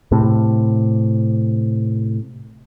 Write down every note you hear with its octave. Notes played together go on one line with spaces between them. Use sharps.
A2 C3